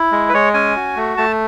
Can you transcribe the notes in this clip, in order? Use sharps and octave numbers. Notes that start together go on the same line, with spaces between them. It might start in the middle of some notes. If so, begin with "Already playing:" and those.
Already playing: E4
G#3
B4
G#3 C#5
C#4 G#5
F#4
A3
A3 A5